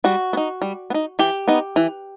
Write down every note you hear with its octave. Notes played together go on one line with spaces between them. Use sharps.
G3 F#4
B3
D#4
G3
B3
D#4
E3 G4
B3 D#4
E3